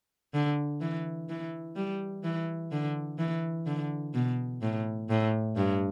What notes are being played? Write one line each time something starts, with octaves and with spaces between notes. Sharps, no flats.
D3
E3
E3
G3
E3
D3
E3
D3
B2
A2
A2
G2